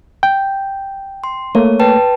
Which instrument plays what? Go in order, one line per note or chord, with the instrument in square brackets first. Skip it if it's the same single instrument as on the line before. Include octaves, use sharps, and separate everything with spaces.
[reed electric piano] G5
[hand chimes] C6
[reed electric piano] A3 A#3 [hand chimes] C#5
[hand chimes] B4 G5 A5